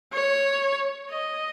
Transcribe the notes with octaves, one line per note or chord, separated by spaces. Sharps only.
C#5
D#5